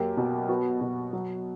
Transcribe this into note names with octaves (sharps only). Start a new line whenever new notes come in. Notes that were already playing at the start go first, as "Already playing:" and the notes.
Already playing: F#2 A#3 G4
B2
B3 F#4
B2
F#3